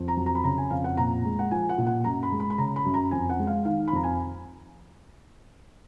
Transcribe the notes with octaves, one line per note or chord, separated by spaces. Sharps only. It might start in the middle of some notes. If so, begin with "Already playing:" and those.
Already playing: F2
A#5
F#3
A#5
B5
C#3 A#5
G#5
F2 F5
F#5
A#2 A#5
G#3
F#5
F3 G#5
F#5
A#2
F#5
F#2 A#5
B5
G#3
B5
B5
C#3 A#5
B5
F#2
A#5
F2 G#5
F#5
G#3
F5
D#3 F5
B5
F2 A#5
G#5